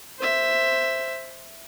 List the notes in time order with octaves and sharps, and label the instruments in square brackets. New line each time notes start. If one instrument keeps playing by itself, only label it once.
[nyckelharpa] C5 E5